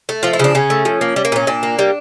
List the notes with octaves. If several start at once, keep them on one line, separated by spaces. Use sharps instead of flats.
A3
F3 F4
E4
C#3 D4
C#3 C#4
A3
F3
A#3
G3
A#3
A#2 C#4
A#2 D4
A#3
G3